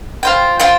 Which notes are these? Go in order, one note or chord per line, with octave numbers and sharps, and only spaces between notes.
F4 C5 G5
F4 C5 G5